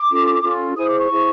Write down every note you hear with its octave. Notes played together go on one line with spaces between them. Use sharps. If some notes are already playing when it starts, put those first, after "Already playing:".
Already playing: D6
C#4 F4 A4
C#4 F4 A4
E4 G#4 C5 D#6
D6
C#6
E4 G#4 C5